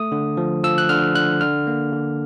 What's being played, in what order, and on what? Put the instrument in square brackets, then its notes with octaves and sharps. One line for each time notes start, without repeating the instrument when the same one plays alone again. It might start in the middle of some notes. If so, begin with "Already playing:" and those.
Already playing: [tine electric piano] A3 D#6
D3
F3
F3 E6
F#6
D3 F6
D3 F#6
D3 F6
A#3
D3